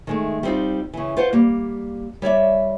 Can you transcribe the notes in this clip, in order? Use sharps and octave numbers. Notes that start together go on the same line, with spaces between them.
D#3 G#3 A3
G3 B3 C4 D#4 F4
C#3 E3
F4 B4 C5 F5 F#5
G3 A#3
G3 C#5 D5 E5